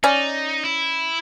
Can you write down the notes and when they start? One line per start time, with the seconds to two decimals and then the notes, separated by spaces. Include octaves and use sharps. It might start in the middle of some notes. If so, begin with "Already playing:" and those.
0.04 C#4 D#4 D5
0.64 E4